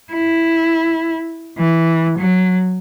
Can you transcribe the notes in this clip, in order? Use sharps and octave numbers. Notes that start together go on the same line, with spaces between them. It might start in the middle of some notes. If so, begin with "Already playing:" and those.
E4
E3
F#3